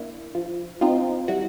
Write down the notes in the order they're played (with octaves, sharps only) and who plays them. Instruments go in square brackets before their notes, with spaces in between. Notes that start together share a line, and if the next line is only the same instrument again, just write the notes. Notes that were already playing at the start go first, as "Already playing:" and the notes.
Already playing: [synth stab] A#3 D4 E4
F3
C4 D#4 F4
G3 E4 F#4